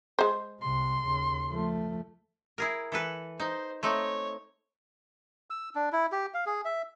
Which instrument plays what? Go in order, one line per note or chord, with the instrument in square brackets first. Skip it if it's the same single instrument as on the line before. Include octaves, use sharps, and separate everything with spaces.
[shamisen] G#3 C5
[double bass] C2 C3 [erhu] C6
[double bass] D#2 C#3
F3 A3
[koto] E4 G#4 A#4
E3 A4 B4
[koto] D#4 [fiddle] C5
[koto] A3 C4 D#4 [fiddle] C#5
[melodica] E6
D4
E4
G4
F5
G#4
E5